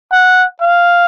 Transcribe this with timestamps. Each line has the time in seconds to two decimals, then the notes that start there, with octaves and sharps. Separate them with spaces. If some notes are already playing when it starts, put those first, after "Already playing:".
0.12 F#5
0.61 F5